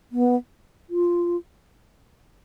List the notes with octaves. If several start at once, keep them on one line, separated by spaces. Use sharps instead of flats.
B3
F4